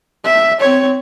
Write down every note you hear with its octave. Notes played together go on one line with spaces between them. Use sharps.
E5
C4 C#5